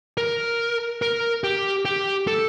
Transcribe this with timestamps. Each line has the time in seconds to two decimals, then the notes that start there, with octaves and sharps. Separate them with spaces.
0.17 A#4
1.02 A#4
1.44 G4
1.85 G4
2.27 A4